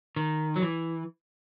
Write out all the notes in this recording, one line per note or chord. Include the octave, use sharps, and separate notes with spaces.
D#3
F#3
E3